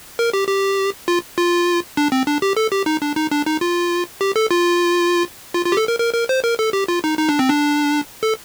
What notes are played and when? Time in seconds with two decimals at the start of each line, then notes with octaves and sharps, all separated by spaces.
0.19 A#4
0.33 G4
0.48 G4
1.08 F4
1.38 F4
1.97 D4
2.12 C4
2.27 D4
2.42 G4
2.57 A4
2.72 G4
2.86 D#4
3.02 D4
3.16 D#4
3.31 D4
3.46 D#4
3.61 F4
4.21 G4
4.36 A4
4.51 F4
5.54 F4
5.66 F4
5.72 G4
5.77 A4
5.88 A#4
5.99 A#4
6.14 A#4
6.29 C5
6.44 A#4
6.59 A4
6.73 G4
6.88 F4
7.04 D#4
7.18 D#4
7.29 D4
7.39 C4
7.49 D4
8.23 A4